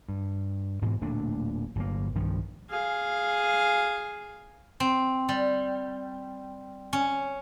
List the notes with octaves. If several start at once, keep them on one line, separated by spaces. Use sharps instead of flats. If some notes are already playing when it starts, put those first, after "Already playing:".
G2
G#2 B2 E3 G#3
D1 A#2 A3 D4
G1 F#3 A#3
B1 G2 D#3 F3
G#4 F5
C4
G3
C#4